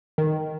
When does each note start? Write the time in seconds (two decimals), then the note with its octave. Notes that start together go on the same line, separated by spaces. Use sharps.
0.18 D#3